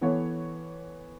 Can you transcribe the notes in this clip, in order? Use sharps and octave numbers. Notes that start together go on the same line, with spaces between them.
E3 B3 A4 C#5